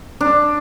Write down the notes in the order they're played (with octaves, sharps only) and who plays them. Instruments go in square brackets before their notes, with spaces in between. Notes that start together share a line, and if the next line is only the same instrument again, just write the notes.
[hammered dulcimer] D4